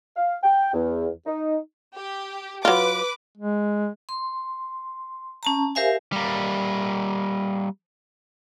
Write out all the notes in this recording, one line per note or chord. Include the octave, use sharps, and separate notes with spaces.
F5
G5
E2
D#4
G4
F#3 F4 B4 D6
G#3
C6
C#4 A5 A#5
G4 A#4 C5 E5 F5 G#5
G3 A#3